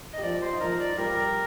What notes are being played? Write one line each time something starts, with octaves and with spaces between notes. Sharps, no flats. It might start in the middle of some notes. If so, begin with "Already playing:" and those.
D#5
G4
F3 F4 D5
C5
D#4
F3 F4 A#4
D5
F4
G3 G4 A#4